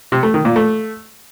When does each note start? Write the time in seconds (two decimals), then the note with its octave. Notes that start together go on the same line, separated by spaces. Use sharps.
0.12 C3
0.23 A3
0.34 D#3
0.45 A#2
0.56 A3